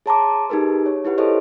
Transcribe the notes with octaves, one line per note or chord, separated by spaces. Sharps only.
G#4 C#5 A5 A#5 C6 D6
D#4 G4 G#4 A#4 B4
C#5
E4 G4 B4 F#5
E4 G#4 A4 C5 C#5 D#5